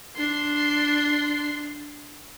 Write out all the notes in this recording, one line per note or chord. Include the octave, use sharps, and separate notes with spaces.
D4 C6